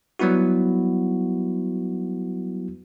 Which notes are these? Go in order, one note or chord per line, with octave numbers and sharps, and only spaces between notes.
F#3 G3 B3 E4 F#4